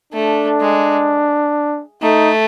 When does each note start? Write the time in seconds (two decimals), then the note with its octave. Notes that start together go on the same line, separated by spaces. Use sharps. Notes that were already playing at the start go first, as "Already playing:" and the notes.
0.13 A3 D4
0.61 G#3
2.02 A3 D#4